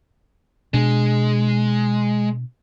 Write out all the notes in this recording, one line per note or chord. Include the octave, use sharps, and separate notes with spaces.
B2 G#3 D4